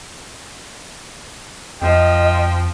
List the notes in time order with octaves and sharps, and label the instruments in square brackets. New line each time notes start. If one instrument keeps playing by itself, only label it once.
[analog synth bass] F2 [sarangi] F3 [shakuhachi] D#5 [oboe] G5